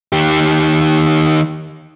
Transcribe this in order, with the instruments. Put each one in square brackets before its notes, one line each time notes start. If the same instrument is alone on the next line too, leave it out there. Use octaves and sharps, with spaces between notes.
[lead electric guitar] D#3 G4